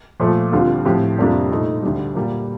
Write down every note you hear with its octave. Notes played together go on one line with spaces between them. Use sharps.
A#2 F3 A3
D2 D3 G3 C4 F4
A2 F3 C4 G4
F2 C3 G3 A#3 D4
A#2 A3 D#4
D2 D3 G3
A#2 G3 A#3